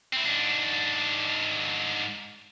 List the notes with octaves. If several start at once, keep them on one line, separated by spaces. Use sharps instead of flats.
C4 E4
G#2 D4